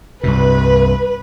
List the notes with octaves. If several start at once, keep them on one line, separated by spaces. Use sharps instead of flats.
C2 G2 C3 B4